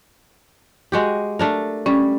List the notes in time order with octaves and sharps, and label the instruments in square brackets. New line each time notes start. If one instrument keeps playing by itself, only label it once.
[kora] G#3 F#4 G4
A3 D4 A#4
[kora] G3 [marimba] C#4